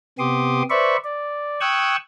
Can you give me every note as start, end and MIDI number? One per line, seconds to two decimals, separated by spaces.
0.19 0.63 48
0.19 0.63 59
0.19 0.63 67
0.19 0.63 84
0.19 0.63 86
0.19 0.63 87
0.70 0.97 71
0.70 0.97 72
0.70 0.97 74
0.70 0.97 76
0.70 0.97 83
0.70 0.97 85
1.04 1.60 74
1.61 1.96 79
1.61 1.96 85
1.61 1.96 87
1.61 1.96 88
1.61 1.96 90
1.61 1.96 92